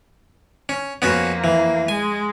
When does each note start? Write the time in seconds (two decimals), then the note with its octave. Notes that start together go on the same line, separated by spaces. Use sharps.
0.69 C#4
1.02 F2 A#3 B3 C#4 F#4
1.44 E3
1.88 G#3 G#5